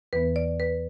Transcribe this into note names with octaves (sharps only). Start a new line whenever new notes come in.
E2 E3 B3 B4
D5
B4